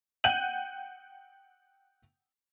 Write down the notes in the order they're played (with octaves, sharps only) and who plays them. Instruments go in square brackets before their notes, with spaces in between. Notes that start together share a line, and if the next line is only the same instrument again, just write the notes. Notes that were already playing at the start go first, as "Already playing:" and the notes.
[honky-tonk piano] F#5 G5 F#6 G6 D#7 F#7